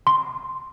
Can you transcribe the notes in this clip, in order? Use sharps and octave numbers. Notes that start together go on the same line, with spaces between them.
C6